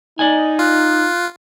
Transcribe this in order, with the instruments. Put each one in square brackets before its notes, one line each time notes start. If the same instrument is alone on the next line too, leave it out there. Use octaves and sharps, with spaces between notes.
[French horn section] D#4 [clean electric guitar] D5 D#5 G#5
[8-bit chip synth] F4 [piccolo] F#6